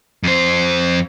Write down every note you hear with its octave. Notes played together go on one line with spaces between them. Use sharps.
F2 C5